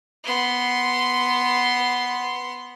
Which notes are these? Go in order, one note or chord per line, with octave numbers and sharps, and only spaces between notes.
B3 C6